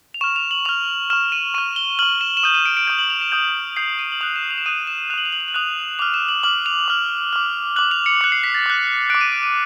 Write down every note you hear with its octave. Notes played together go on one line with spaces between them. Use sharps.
F7
C#6 F6 E7
F7
F#7
C#6 F6 F7
C#6 F6 E7
D#7
C#6 F6 D#7
G7
C#6 F6 F#7
E7
E7
D#6 G6 D#7
D#7
D7
D7
D#6 G6 D#7
F#7
F7
E7
D#6 G6
D#6 G6 C7
D#7
F#7
D#6 F#6 F7
E7
F7
E7
D#6 F#6 D#7
E7
D#6 F#6 F7 F#7
F7
F#7
F7
F#7
D#6 F#6 F7
D6 F6 F7
E7
F#7
D6 F6 F#7
F7
D6 F6
D6 F6
D6 F#6 F#7
F7
C#7
D6 F#6 C#7
C7
B6
A6
D6 F#6
D6 F#6 D7
D#7
D7
D#7